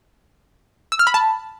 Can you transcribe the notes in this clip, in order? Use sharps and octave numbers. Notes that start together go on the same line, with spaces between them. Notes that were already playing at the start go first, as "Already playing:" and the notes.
E6
F6
B5
A5